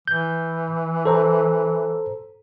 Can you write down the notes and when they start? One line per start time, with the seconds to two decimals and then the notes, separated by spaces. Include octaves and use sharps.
0.08 E3 G6
1.05 A4 C5 A#5